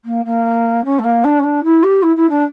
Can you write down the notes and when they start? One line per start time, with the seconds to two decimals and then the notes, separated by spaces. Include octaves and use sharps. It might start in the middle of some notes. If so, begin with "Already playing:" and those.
0.05 A#3
0.25 A#3
0.84 C#4
0.98 A3
1.04 A#3
1.24 D4
1.39 C#4
1.43 D4
1.63 E4
1.83 G4
2.02 E4
2.16 E4
2.29 D4